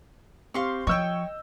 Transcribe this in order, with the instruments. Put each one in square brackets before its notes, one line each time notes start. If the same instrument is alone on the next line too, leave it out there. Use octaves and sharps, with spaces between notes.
[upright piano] C4 G4 [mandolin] F5 C6 C#6
[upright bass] F3 [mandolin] C#5 G5 [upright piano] D#5 G6 [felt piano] C#6 E6